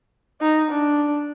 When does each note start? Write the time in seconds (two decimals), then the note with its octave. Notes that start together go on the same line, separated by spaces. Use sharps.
0.41 D#4
0.71 D4